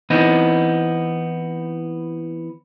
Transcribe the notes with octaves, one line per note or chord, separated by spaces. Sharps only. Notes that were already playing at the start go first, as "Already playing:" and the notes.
E3 B3 C4 D#4